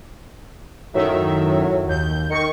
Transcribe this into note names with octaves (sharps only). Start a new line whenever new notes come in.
F#2 A2 D#3 F#3 E5
D#2 G6
D#3 C#6 C#7